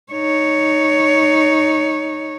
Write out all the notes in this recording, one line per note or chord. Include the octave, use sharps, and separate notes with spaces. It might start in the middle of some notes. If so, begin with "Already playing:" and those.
D#4 C#5